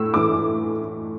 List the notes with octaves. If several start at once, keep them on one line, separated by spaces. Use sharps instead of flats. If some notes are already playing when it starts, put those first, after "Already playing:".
Already playing: A2 A3 E6
A2 E3 A3 D6